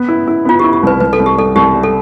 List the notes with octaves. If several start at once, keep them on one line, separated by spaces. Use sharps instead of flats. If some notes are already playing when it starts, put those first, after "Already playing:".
Already playing: B3
E4
E4
B3 F4
E4 G4
G4
C2 B4
C2 B4
A4
C2
G4
G3 A4
C2 G4
G3
A4